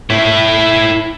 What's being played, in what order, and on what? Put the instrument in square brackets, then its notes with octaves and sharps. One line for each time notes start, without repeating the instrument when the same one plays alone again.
[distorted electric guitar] E4 C#5